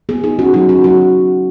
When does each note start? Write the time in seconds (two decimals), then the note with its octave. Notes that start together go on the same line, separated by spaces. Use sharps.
0.09 B3 G#4
0.24 D#4 G#4
0.39 C#4 F#4
0.54 F#3 D#4
0.69 C#4 F#4
0.84 F#3 F#4